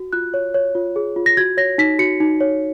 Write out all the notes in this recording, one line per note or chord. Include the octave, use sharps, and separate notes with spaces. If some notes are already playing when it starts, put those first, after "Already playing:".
Already playing: F#4
F4 F#6
C#5
C#5
F4
G#4
F4
A#6
F#4 G#6
C#5 A#6
D#4 B6
F#4 C#7
D#4
C#5